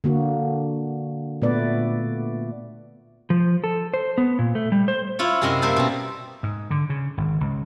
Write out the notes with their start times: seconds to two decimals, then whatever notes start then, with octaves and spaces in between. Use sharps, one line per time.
0.04 D3 A#3 F#4
1.42 A#2 A3 B3 B4 D5
3.30 F3
3.64 A4
3.94 C5
4.18 B3
4.39 A#2
4.55 A3
4.72 G3
4.88 C5
5.19 E4 F4 C#5
5.42 F#2 C3 C4 E4 D#5 C6
5.62 G3 A#3 C5 E5 A5
5.76 B2 C4
6.43 G#2
6.71 D3
6.90 C#3
7.17 G#1
7.41 C#2